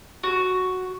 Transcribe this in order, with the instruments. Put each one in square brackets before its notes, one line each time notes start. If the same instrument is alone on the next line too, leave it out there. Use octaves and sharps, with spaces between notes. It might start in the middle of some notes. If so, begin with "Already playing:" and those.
[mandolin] F#4